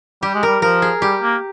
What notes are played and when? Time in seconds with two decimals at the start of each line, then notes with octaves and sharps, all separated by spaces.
0.23 G3 G4
0.35 G#3
0.43 G3 A#4
0.62 F3 A#4
0.82 G#4
1.02 G3 G4
1.22 A#3